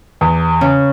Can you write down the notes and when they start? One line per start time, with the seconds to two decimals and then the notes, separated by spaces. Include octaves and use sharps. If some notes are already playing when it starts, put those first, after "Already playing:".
0.21 E2
0.61 C#3